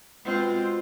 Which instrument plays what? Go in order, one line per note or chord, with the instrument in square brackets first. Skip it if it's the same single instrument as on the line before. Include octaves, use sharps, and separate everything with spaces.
[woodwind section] B2 G#3 [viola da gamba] C4 F4